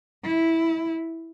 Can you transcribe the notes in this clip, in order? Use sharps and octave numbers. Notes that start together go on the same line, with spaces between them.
E4